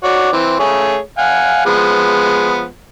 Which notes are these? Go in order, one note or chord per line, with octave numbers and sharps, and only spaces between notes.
F#4 C#5 D5
E3 C4
A3 G#4 C#5
F5 F#5 G#5
F3 G#3 B3